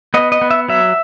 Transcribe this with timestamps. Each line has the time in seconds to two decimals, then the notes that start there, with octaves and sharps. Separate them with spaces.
0.14 B3 D#5
0.32 D#5
0.41 B3
0.51 E5
0.68 F#3 E5